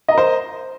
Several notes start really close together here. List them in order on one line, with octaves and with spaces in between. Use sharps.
D#5 A#5 A#4 C5